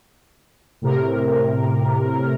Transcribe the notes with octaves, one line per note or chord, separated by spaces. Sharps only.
A2 C3 A#4